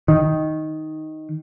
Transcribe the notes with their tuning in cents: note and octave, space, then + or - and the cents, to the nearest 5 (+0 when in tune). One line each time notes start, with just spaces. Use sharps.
D#3 +5